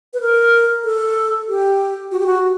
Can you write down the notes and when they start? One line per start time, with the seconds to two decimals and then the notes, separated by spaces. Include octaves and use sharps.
0.14 B4
0.21 A#4
0.85 A4
1.49 G4
2.12 F#4
2.19 G4
2.26 F#4